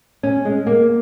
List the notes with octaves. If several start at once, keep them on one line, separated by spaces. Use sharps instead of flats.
C#4
G#3
A#3